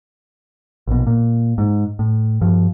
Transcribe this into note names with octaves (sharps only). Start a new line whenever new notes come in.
A#1 B2
A#2
G#2
A2
G2 F3